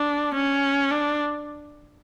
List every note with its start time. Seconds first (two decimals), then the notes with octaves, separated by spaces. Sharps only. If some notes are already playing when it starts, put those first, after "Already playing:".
Already playing: D4
0.35 C#4
0.91 D4